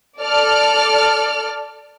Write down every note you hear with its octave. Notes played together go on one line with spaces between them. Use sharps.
A4 D5 F6